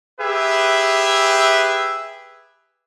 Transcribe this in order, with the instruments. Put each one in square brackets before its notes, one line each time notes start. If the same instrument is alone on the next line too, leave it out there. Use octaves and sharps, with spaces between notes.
[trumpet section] G4 G#4 B4 E5